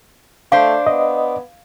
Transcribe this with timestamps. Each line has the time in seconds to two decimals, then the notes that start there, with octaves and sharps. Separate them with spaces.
0.52 A3 D4 C5 F5
0.87 B3 D#5